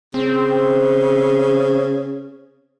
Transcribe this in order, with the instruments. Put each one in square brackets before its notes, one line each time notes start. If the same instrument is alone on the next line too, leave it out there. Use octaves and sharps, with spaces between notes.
[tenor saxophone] C#3 [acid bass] C4